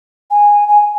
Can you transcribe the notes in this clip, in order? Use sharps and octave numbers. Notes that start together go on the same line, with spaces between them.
G#5
G#5